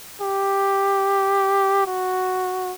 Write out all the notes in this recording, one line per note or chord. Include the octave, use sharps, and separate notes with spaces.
G4
F#4